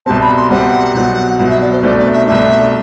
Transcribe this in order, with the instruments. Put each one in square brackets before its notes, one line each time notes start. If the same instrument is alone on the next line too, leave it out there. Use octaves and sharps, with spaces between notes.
[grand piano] C2 B2 G3 C4 [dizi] A5
[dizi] B5
C6
[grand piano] C2 B2 G3 C4 [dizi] F#5
[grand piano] C2 B2 F#3
[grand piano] C2 B2 F#3 [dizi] F#5
[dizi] E5
D5
C5
[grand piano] C2 B2 A3 D4 [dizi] C5
[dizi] D5
E5
[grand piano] C2 B2 A3 D4 [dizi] E5